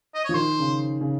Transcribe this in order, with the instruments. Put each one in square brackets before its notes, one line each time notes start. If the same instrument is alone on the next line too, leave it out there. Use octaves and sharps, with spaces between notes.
[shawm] D#5
[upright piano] F3 [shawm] C#5
[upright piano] D#3 [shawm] C5
[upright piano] C#3
C#3